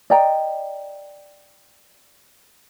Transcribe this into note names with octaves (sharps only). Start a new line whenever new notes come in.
D5 D#5 G5 A#5